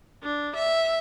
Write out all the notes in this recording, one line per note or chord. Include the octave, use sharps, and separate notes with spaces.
D4
E5